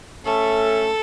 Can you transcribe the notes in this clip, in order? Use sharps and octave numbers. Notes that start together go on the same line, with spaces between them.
A3 C#4 A4